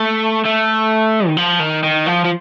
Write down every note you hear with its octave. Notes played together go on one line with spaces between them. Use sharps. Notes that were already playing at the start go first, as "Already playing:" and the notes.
Already playing: A3
A3
D#3
F3
D#3
D#3
F3
F3